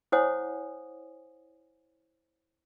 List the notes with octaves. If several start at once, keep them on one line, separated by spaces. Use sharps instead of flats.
E4 C5 C#5 F#5 G#5 D#6